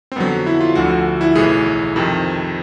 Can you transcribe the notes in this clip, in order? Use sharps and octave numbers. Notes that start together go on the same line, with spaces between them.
C4
F2 D3 F#3 B3
E4
F4
D2 D3 F3 F#4
F#4
E4
B1 A2 E3 G#4
F2 C3 D#3